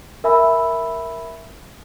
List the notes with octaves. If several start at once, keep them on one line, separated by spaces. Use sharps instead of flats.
A#4 E5 G#5 B5 E6